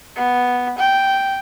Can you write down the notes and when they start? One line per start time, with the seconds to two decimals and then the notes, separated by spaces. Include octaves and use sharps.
0.16 B3
0.78 G5